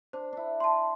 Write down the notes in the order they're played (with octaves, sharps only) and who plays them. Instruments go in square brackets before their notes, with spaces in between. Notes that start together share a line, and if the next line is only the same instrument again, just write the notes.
[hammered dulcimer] D4 [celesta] C5
[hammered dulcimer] D4 E4
[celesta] A5 C6